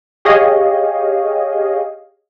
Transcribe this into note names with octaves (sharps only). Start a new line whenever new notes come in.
G4 G#4 C#5 D#5 F5